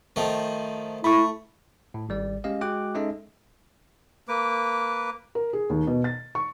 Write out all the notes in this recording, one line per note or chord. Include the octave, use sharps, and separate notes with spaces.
D#3 F3 A3
A3 E4 B5 C#6
A2
G#1 G3 D5
G#3 C#4 G4 D#5 F5
G#3 F#4 G5 D6 F#6
G#3 C#4 D#4 A4 D#5 E5
A#3 B4 D6
A#4
G#4
D#2
B2
A6
C#6